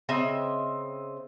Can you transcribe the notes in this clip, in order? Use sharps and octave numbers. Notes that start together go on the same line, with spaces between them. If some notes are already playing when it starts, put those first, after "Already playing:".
C#3 C4 D#5 E5